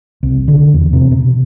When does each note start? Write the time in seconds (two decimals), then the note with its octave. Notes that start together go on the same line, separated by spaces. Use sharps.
0.23 C2
0.48 D3
0.74 E2
0.93 C3
1.11 B2